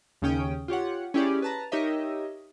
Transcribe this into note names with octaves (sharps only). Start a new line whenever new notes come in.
D#2 C#3 C#4 G5 D#6
F4 G4 C#5 F#5
C#4 E4 G4 G#4 D5
B4 A5 A#5
D#4 G4 A#4 C#5 D#5 E5